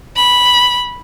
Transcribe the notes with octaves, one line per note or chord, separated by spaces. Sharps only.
B5